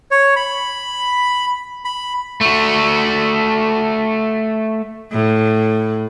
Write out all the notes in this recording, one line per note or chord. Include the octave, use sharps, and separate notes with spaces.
C#5
B5
B5
A3 F#4
A2